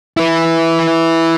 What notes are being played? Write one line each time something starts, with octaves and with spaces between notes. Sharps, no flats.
E4 B4